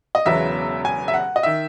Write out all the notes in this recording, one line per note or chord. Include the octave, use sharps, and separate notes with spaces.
D#5
E1 E2 C#3 F#3 B3 E5
G#5
E5
F#5
D#5
D#3 E5